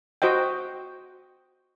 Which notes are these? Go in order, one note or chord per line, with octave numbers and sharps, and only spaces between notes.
F#4 C5 D#5 G5